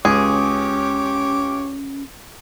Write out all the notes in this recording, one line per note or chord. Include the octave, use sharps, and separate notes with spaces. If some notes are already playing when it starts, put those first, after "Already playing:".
C#2 C#4 G4 G#4 C#5 D6